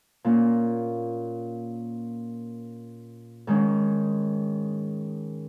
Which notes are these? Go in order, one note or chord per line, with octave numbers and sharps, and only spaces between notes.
A#2 A#3 C#4
G#2 D#3 G#3 C#4